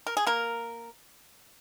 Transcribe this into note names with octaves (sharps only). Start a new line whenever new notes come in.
A#4
G#4
A#3 A#4